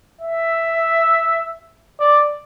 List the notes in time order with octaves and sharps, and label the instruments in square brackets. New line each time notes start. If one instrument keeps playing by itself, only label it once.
[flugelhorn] E5
D5